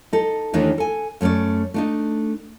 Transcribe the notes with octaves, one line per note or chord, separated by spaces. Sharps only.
D#4 A4
D#2 D#3 E3 A3 D4 D#4
A4 G#5
F#2 A3 A#3 C#4 D5
A3 D4 D#4